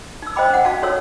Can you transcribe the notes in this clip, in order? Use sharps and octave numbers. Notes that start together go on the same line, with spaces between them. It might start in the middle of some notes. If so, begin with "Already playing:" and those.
D#4 E6
C5 D#5 F5 G5 B5 D6
C#4 F#5
D#4 F#4 F5 A5
D#4 F#4 A4 C#5 E6